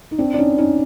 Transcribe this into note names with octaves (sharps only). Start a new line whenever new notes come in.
D#4
C4 D4
D4
C#4 D#4
C#4 D#4